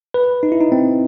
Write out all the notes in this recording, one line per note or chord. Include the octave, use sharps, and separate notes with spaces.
B4
D#4
E4
D#4
C4